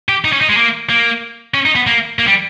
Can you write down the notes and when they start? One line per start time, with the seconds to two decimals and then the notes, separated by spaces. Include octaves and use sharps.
0.09 G4
0.25 D#4
0.33 C#4
0.41 D#4
0.49 G#3
0.57 A#3
0.90 A#3
1.54 C#4
1.66 D#4
1.75 B3
1.87 A#3
2.19 A#3
2.27 G3